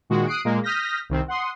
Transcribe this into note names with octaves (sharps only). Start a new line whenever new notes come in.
A#2 D#3 G#3 F#4
D#6 F#6 C7 D7
A#2 G#3 A#3
D#6 F6 G6 A#6 B6
C2 D#3 C4
F#5 C6 D#6